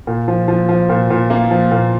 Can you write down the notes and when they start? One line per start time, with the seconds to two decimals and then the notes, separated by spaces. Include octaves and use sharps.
0.07 A#2
0.28 F3
0.48 F3
0.69 F3
0.89 A#2
1.10 A#2
1.30 A#3
1.51 F3
1.71 A#2